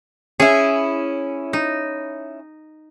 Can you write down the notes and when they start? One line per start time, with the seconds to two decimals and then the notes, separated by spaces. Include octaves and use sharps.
0.40 C#4 E4 G#4
1.53 D#4